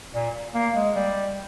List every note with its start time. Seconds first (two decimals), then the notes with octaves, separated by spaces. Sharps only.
0.15 A#2
0.54 A#3
0.75 G#3
0.95 G3